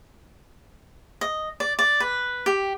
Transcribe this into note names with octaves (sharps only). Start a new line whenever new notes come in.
D#5
D5
D5
B4
G4